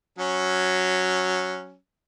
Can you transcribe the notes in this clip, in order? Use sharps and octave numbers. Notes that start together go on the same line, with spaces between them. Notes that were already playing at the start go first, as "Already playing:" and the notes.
F#3 C#4